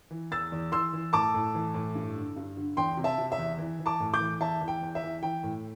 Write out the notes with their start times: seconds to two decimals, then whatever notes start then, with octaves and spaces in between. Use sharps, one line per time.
0.11 E3
0.31 E2 E6 A6
0.52 E2
0.72 E3 C6 E6
0.93 E3
1.13 A2 A5 D6
1.34 A2
1.55 E3
1.74 A2
1.95 G2
2.16 D3
2.36 G2
2.57 D3
2.77 E2 G5 C6
2.97 C3
3.04 E5 A5
3.18 C3
3.32 E5
3.38 E2
3.58 E3
3.79 E3
3.86 A5 D6
4.00 A2
4.13 D6 G6
4.20 E3
4.41 E2 E5 A5
4.61 E3
4.68 G5
4.82 E2
4.95 E5
5.03 E3
5.22 E3 G5
5.43 A2